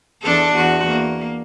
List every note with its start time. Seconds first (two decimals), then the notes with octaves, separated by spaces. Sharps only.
0.23 E2 D4 A4
0.55 E2 F#4
0.88 A#3